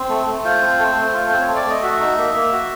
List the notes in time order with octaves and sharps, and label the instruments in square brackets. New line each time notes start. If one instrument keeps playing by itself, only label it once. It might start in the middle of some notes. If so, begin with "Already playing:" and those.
Already playing: [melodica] C4
A3
A3
F4 C5
C4
A3
A3
F4
C4 C5
C#5
A3
D5
A3 D#5
F#4 E5
D#4
A#3
A#3
F#4